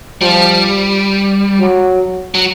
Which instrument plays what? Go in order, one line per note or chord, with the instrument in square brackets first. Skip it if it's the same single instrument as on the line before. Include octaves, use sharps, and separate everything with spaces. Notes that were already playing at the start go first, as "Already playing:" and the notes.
[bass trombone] F3 [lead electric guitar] G3
[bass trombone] F#3
[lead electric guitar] F#3